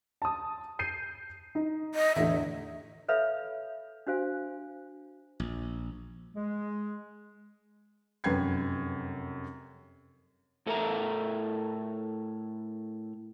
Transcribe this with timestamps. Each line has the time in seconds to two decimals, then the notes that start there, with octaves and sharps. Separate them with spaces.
0.22 A5 D#6
0.79 G6 C7 D#7
1.55 D#4
1.95 D#5
2.16 E2 A2 D3 E5
3.09 A4 B4 C#5 E5 F5 B5
4.07 D4 F#4 C5 F5 G#5
5.40 A#1
6.35 G#3
8.24 F1 F#2 B4 G5 G#6 C7
10.66 A2 A4 A#4 D#5 E5 A#5